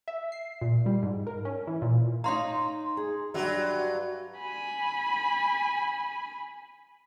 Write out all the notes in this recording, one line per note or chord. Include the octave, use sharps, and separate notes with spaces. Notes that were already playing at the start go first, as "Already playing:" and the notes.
E5
C7
A#2
G3
G#2
A#4
C#4
E3
A#2
D#4 C#5 F5 A#5 C6
G#4
G2 F#3 E5
G#5 B5